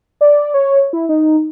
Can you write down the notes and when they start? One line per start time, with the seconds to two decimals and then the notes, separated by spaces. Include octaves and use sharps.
0.21 D5
0.54 C#5
0.93 E4
1.09 D#4